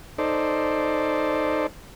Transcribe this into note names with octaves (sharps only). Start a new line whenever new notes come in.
D#4 A4 C5 D5